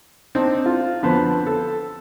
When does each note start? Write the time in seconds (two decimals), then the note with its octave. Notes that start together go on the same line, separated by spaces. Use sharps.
0.35 C4 D4 D#4
0.66 F4
1.03 F2 D3 B3 A4 C5
1.46 A4